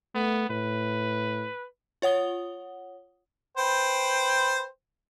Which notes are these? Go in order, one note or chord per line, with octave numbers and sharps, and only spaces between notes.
A3 B3
A2 B4
F4 C#5 F#5 D#6 G7
B4 C5 G5